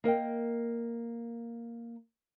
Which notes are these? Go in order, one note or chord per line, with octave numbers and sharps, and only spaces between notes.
A#3 A#4 D#5 G5